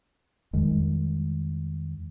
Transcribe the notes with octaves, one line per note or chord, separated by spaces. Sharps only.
F2 D#3 G3 G#3